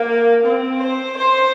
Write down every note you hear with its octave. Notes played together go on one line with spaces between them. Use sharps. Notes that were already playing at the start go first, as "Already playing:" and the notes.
Already playing: A#3
C4
C5
C5